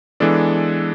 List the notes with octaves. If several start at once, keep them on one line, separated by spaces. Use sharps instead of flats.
E3 G#3 B3 D4 A4